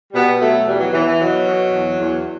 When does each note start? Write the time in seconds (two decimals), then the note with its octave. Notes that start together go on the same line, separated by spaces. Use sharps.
0.12 B2 G3 B3
0.40 B2 F#3 A3
0.65 E2 E3 G3
0.79 F#3
0.92 E2 E3
1.06 E3
1.18 B2 F#3
1.45 B2
1.72 E2
1.98 E2